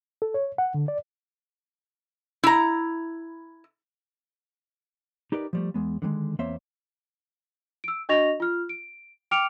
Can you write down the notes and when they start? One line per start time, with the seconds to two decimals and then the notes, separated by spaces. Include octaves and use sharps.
0.22 A4
0.34 C#5
0.58 F#5
0.74 D3
0.88 D5
2.44 E4 A#5
5.32 D#4 G4 A#4 B4 D5
5.53 F3 G3 A3
5.74 E2 G#3 B3
6.02 D3 D#3 F#3 G#3
6.39 E2 A#3 C4 C5 C#5 E5
7.84 E6 D7
8.09 D4 F#4 D#5 C#6 A#6 F7
8.40 F4 F6
8.69 D7
9.31 G5 D6 F6 C#7 D7 F7